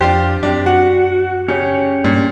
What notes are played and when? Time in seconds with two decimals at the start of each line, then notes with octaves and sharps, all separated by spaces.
0.01 F2 D4 F4 G4 C5
0.43 F#2 C3 D4
0.66 F#4 F#5
1.48 C#3 C#4 G4 C#5
2.04 G2 A#2